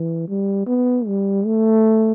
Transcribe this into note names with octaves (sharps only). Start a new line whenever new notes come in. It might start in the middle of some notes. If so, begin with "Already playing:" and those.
Already playing: E3
G3
B3
G3
A3